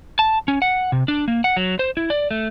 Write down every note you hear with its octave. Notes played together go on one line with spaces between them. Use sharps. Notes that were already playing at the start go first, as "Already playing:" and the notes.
A5
C#4
F#5
C3
D4
A#3
F#5
F#3
C5
E4
D5
A3